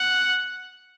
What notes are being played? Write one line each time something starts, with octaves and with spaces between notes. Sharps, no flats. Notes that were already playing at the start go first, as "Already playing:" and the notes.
Already playing: F#5